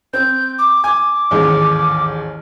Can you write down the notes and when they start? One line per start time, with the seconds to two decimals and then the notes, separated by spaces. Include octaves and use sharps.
0.13 C4 G6
0.59 D6
0.84 G#5 D6
1.31 A1 D#2 G#2